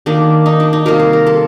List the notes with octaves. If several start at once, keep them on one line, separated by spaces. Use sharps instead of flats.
D#3 A#3 D4
D#4
D4
D#4
C3 G3 A#3 A#4
C5
A#4
A4